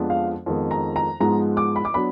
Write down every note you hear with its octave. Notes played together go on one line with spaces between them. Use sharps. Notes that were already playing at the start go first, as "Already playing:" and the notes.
Already playing: F2 F3 G#3 B3 D4
F5
F2 D#3 G#3 B3
A#5
A#5
G#2 F3 G#3 B3 A#5
D6
B5
D6
F#3 B3 D4 B5